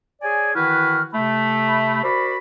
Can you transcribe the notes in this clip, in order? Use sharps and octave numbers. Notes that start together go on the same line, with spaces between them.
G#4 C#5 D5 G#5
D#3 E3 E4 F#4 B4 F6
C3 A3 B5
F#4 A#4 C5 D5 B5